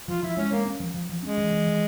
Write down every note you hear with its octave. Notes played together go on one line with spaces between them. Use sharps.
F3 F4
F3 E4
G#3 C#4
G#3 A#3
C#4
F3
F3
F3
G#3 C#4
E3
E3
E3